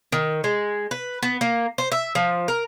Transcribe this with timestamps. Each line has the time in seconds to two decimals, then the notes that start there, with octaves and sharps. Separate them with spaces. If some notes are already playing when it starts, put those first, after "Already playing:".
0.12 D#3
0.44 G#3
0.91 B4
1.23 B3
1.41 A#3
1.78 C5
1.92 E5
2.15 F3
2.48 A#4